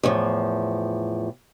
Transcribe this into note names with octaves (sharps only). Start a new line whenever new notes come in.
E2 A2 D3 F3